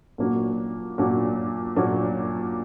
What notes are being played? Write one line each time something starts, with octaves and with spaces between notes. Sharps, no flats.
A#2 F#3 A#3 D4 F#4
A#2 F#3 A#3 D4 F#4
A#2 F#3 A#3 D4 F#4